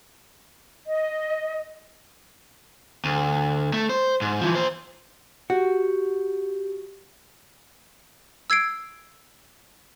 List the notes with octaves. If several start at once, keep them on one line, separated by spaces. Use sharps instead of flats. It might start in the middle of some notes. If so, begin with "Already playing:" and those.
D#5
D2
A3
C5
G#2
E3 F3
A#3 C5
F#4 G4
E6 G#6 C7 D7